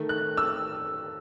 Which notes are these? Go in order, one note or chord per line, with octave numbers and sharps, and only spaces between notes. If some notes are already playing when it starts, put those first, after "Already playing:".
Already playing: D#3 A3
F#6
E6